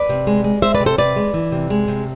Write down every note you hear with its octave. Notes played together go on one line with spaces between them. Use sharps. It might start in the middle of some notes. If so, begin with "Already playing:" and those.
Already playing: B4 D5
C3
G#3
G#3
G#3 C5 E5
B4 D5
C3
A4 C5
C3 B4 D5
G#3
E3
C3
G#3
C3